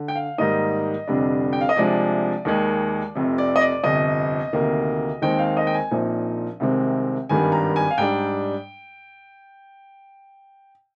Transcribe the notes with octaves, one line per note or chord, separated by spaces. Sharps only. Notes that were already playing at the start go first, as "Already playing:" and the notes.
Already playing: D3
G5
F5
G#2 D#3 G3 A#3 D#4 D#5
F1 F2 D3 G3 D4
G5
F5
D#5
C2 C3 F3 G#3 D4 D5
D#2 D#3 G#3
F1 F2 C3
D5
D#5
D5
G1 F2 C3 D#5
D2 C3 D#3 A#3
D#2 D#3 G#3 C4 D#4 G5
F5
D#5
G5
G#5
A#1 A#2 F3 C4 D#4
C2 C3 D#3 G#3 C4
G#1 G2 D#3 G3 G#5
A#5
G#5
F5
G#2 G3 D4 G5